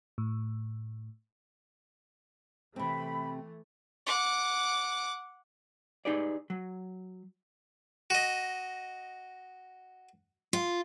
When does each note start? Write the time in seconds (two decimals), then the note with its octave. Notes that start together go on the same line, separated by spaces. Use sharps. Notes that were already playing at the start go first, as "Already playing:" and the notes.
0.18 A2
2.76 C3 E3 A3 C4 B5
4.07 F#5 D6
6.05 D#4 G4 G#4 B4 D5
6.50 F#3
8.10 F#4 D#5
10.53 F4